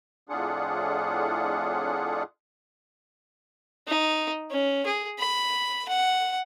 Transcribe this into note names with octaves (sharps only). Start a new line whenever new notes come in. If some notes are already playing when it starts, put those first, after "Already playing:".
F2 A2 D4 F4 G#4 F#5
D#4
C#4
G#4
B5
F#5